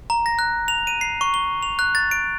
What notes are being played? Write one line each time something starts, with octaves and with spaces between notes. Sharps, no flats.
A#5
A#6
F#6
F7
D#7
C7
C#6
G7
F7
F#6
A6
D7